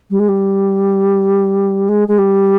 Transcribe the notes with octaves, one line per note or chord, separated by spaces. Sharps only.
G3
G#3
G3
G#3
G#3
G3